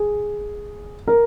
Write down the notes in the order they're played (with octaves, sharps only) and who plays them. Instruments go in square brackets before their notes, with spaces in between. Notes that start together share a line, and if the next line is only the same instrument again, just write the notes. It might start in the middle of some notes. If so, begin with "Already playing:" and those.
Already playing: [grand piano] G#4
A#4